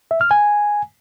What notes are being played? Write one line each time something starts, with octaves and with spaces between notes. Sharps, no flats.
E5
F6
G#5